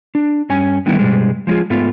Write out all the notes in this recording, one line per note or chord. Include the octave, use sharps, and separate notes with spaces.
D4
G2 C#4 G#5
D3 D#3 G3 A3 B3 E4
G2 B2 G3 G#3
F3 G#3 D#4 F4 G#4
G#2 A3 B3 F4